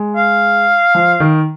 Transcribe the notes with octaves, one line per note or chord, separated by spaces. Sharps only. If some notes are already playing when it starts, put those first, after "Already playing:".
Already playing: G#3
F5
F3
D#3